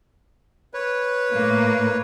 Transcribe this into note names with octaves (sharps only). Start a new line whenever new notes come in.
B4 C#5
A2 A#3